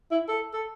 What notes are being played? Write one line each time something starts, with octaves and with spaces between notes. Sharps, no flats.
E4
A4
A4